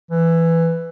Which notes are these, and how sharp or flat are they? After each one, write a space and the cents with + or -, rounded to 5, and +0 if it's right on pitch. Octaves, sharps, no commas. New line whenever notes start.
E3 +10